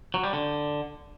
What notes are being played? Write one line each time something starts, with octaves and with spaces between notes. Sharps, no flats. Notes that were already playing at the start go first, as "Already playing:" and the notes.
F#3
G3
D3